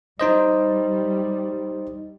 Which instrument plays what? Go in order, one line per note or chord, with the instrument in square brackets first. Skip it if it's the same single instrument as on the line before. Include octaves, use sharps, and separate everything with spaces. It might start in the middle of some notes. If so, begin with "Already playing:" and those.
[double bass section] G3 [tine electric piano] D#4 C5 D#5